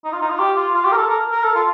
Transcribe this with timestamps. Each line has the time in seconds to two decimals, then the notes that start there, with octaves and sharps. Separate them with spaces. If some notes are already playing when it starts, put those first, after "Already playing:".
0.05 D#4
0.13 F4
0.22 D#4
0.30 F4
0.39 G4
0.57 F4
0.74 F4
0.85 G4
0.92 A#4
0.97 A4
1.09 A#4
1.32 A#4
1.43 A4
1.55 F4